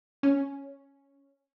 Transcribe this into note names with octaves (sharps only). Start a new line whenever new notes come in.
C#4